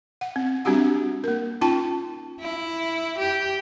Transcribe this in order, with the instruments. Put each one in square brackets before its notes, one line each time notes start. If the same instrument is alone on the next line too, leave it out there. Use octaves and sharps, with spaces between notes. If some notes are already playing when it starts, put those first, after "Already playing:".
[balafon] F#5
C4
G3 C4 D4 F#4 G4 F#5
A#3 A#4
C#4 D#4 F4 G5 A5
[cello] E4
G4